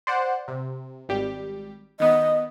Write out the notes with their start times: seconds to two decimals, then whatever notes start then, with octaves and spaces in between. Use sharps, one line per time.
0.07 C5 D5 F#5
0.48 C3
1.09 G#1 G3 G4
2.00 D#3 B3 D#5